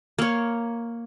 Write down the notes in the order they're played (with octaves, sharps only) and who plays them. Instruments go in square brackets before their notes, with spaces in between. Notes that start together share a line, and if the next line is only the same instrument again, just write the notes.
[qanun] A#3 C#5